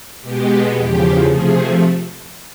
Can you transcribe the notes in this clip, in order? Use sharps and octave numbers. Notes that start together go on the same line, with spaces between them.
B2 G#3 B3 G4
E2 C#3 F3 G4
C3 F3 A3 G#4